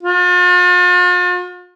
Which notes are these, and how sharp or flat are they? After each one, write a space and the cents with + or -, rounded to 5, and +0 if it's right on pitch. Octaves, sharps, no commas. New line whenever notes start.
F4 +45